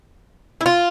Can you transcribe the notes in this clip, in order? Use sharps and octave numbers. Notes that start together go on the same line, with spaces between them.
E4
F4